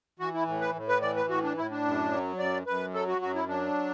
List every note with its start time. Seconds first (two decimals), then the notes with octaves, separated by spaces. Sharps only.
0.19 E3 F#4
0.34 E4
0.47 A2
0.61 B4
0.75 A2
0.89 B4
1.02 E3 D5
1.16 B4
1.30 A2 F#4
1.43 D4
1.57 A2 E4
1.71 D4
1.85 F#2
2.12 F#3
2.39 F#2 D5
2.66 F#2 B4
2.94 F#3 A4
3.08 F#4
3.22 F#2 F#4
3.35 E4
3.49 F#3 D4